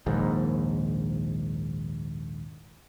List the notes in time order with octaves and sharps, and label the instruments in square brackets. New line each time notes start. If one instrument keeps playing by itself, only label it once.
[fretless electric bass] A#1 D#2 G#2